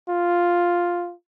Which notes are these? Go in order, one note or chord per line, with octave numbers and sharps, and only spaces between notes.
F4